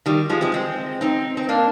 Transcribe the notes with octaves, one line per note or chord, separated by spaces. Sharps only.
D#3 G3
F3 G#3
G#3 C4
G#3 C4
C4 D#4
C4
A#3 D4